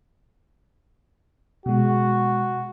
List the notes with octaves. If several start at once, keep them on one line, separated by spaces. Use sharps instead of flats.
B2 G#3 F#4